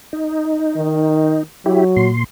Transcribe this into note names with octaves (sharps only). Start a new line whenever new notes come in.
D#4
D#3
F#3 E4 G4
A#2 C6